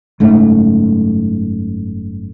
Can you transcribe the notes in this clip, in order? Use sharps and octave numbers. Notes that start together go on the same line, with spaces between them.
F#1 G#2 A3